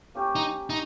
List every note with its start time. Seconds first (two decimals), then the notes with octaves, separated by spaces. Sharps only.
0.15 A#3 C#4 G4
0.36 D#4
0.70 D#4